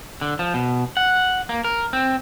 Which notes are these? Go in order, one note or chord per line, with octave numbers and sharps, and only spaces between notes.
D3
F3
B2
F#5
A#3
A#4
C4